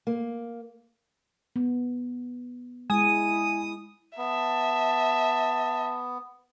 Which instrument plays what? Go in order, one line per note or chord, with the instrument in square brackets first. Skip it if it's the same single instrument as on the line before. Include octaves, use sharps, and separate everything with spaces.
[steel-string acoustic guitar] A#3
[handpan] B3
[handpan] G#3 [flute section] E4 [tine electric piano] G#5 [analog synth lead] D#6
[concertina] B3 [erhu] E5 [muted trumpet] A5